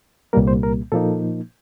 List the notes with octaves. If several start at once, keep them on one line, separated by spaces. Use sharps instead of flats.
C2 A#2 G3 A#3 A#4
C5
A#4
A#2 F3 A#3 D#4 A4